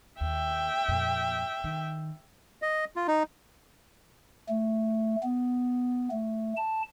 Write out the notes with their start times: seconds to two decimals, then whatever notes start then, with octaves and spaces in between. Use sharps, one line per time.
0.21 D#2 E5 G5
0.88 F2 A#2
1.64 D#3
2.62 D#5
2.96 F4
3.08 D#4
4.49 A3
5.23 B3
6.11 A3
6.56 A5